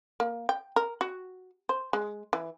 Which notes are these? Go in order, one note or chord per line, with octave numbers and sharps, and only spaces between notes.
A#3
G5
A#4
F#4
C5
G#3
E3